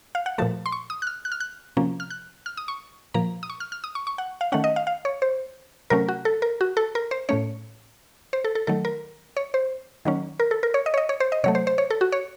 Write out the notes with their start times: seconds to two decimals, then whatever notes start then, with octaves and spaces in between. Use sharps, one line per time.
0.15 F5
0.26 F#5
0.38 A#2 F3 A3 A5
0.66 C6
0.72 C#6
0.90 D#6
1.02 F#6
1.07 F6
1.25 F#6
1.32 F6
1.40 F#6
1.77 C3 F3 A#3 C#4
2.00 F6
2.10 F#6
2.46 F6
2.57 D#6
2.68 C#6
3.14 A#2 F3 A#3 A#5
3.43 D#6
3.50 C#6
3.60 F6
3.72 F6
3.84 D#6
3.95 C#6
4.07 C#6
4.18 F#5
4.41 F5
4.52 D#3 A3 C#4 F#5
4.64 D#5
4.76 F5
4.87 F5
5.05 C#5
5.22 C5
5.90 C3 F#3 A3 C#4 A#4
6.08 F#4
6.25 A4
6.42 A#4
6.61 F#4
6.77 A4
6.95 A#4
7.11 C5
7.29 A2 A3 C#4 C#5
8.33 C5
8.44 A4
8.55 A4
8.67 D#3 F#3 A3 A4
8.85 A#4
9.37 C#5
9.54 C5
10.05 D#3 F#3 A#3 C#4
10.40 A#4
10.51 A4
10.63 A#4
10.74 C#5
10.86 D#5
10.94 C#5
10.97 D#5
11.09 C#5
11.20 C5
11.32 D#5
11.44 C3 F#3 A3 C#5
11.55 C5
11.67 C5
11.78 C#5
11.90 A4
12.01 F#4
12.12 C#5